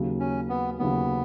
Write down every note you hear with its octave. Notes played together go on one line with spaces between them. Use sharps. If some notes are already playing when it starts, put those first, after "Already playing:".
Already playing: D#2 C#3 F#3
C#4
B3
D#2 C#3 F#3 B3